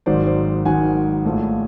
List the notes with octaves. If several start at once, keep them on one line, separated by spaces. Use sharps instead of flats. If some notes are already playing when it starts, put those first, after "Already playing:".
G#1 G#2 D#3 F#3 C5 D5
C5 D5
G#1 G#2 D#3 F#3 F#5 G#5
A#1 A2 F3